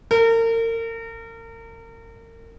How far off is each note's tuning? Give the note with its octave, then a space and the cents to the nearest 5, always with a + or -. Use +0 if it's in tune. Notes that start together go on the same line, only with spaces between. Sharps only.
A#4 -35